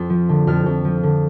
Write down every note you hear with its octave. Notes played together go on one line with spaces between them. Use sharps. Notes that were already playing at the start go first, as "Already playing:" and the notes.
Already playing: F2 C6
F3
D3
F2 F6
F2
F3
D3